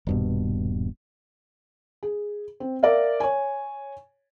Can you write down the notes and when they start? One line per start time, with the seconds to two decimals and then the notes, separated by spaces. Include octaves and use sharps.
0.07 D#1 G2 B2
2.03 G#4
2.60 C4
2.83 A#4 D5 E5 F5
3.20 C#5 G#5